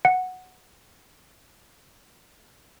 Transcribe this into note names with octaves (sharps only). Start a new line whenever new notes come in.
F#5 C#7